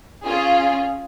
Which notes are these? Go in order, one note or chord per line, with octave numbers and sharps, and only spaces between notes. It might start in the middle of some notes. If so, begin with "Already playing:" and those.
C#4 F4 G#4